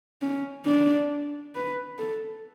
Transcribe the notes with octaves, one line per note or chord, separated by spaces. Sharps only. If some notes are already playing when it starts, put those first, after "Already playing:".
C#4
D4
B4
A4